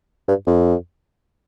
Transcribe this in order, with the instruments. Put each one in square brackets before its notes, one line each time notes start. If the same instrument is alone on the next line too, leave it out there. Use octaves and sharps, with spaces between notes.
[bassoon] G2
F2